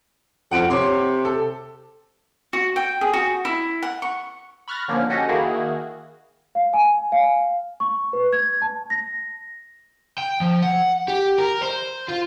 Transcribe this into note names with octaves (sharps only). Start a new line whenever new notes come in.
F2 F#5 D7
C3 C#5 C6 D6
A4
F#4
G5
G#4
F#4
E4
F#5
C#6
B5 C#6 F6 F#6 A6 A#6
D3 F3 A#3 C#4
C#4 F#4 G4 A4 D#5
D#3 A#3 E4 F#4 G#4
F5
G#5
F5
C#6
B4
G#6
A5
A#6
G5
F3
F#5
G4
A#4
C5
F4